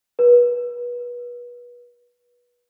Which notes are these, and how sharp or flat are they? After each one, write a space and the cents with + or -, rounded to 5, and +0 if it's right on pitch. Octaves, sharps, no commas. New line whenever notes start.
B4 -30